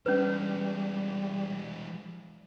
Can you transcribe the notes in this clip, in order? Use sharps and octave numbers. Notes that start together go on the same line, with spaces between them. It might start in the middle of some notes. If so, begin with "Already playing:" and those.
E3 G3 G#3 C#4 B4